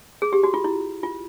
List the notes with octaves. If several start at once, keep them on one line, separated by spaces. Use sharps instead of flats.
G#4
G4
F#4
F4
E4
F4